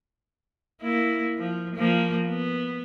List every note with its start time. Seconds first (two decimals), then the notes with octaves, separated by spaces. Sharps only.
0.82 A#3 E4
1.38 F3
1.75 F3 A#3
2.26 B3